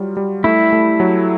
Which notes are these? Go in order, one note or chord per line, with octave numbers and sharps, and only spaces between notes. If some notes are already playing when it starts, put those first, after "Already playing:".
Already playing: F#3 G3 F4
G3
A3 E4
A3
F#3